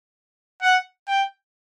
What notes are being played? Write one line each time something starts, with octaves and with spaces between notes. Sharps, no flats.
F#5
G5